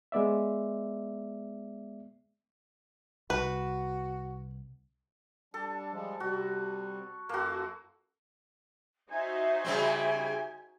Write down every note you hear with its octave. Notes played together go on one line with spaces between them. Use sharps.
G#3 B3 D5 E5
C2 F#4 B4
G3 D4 A4
F3 G3 G#3
C3 G3 F#4
F#2 A#3 F4 F#4 A4
D#4 F#4 C5 E5 G#5
C#3 G3 C4